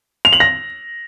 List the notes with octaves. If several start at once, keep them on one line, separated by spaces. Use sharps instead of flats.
F7
F#7
A#6